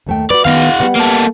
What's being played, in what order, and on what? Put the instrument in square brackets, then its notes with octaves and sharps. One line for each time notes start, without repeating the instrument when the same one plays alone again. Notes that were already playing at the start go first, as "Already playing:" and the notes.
[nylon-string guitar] D#2 A3 G5
[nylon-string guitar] F#4 B4 [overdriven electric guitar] D5
[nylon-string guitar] D#3 B3 [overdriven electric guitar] F#4 F5
[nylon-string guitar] G3 B3 F#5
[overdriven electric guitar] A#3 A4